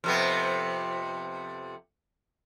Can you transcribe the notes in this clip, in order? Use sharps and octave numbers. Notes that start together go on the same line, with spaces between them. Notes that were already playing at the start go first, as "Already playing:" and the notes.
F2 C3 B3